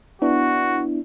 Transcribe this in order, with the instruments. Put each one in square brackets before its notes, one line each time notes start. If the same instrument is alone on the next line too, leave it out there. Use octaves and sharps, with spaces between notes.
[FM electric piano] B3 D4 E4 [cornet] F#4